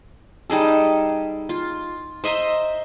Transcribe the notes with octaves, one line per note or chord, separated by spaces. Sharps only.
G3 D#4 G#4 A4
F4
C5 D#5 E5 A#5